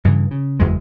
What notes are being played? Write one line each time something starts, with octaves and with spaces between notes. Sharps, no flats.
G2 C#3 E3
C#3
F#1 E2 G#3